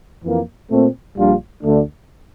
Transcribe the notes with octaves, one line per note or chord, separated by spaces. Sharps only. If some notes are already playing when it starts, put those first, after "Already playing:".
F2 E3 A#3
A#2 A3 C4
A#1 A#2 G3 D4 F4
D2 D3 A3 D4